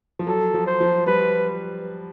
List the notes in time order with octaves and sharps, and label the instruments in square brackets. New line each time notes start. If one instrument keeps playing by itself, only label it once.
[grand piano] F3
[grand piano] F#3 [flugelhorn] A4
[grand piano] F3
[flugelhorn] C5
[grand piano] F3
[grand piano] G3 [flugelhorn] B4